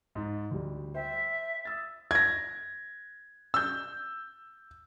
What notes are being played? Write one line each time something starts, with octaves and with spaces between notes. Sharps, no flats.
G#2
D2 G3
C5 E5 G5
D#6 E6 A6
G#6 A#6
E6 G6